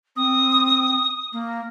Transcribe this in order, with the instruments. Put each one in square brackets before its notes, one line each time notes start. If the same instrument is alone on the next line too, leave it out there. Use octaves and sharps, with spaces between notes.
[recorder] C4 [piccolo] D#6
[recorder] A#3